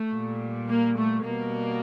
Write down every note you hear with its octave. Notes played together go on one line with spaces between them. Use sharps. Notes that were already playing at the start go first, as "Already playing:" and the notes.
Already playing: A3
A#2 G3
A#3
A3
B2 G3 A#3